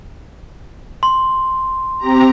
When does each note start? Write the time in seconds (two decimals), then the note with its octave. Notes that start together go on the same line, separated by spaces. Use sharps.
1.03 C6
1.98 C4 G4 A#5